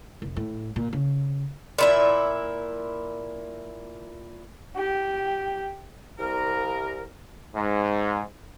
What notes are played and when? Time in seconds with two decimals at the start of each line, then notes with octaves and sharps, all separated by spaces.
0.22 F1
0.37 A2
0.76 A#2
0.93 C#3
1.78 A#2 E4 E5
4.76 G4
6.19 C2 A#4
7.54 G#2